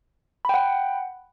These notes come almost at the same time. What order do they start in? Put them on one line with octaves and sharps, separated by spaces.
B5 G5 F#5